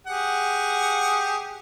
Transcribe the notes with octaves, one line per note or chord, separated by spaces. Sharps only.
G4 G#4 F#5